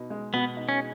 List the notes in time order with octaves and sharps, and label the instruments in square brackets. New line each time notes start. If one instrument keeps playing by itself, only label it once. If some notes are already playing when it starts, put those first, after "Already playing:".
Already playing: [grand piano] B2 D#4
G#3
[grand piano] B2 [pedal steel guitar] B3
[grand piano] D#4
[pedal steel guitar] C#4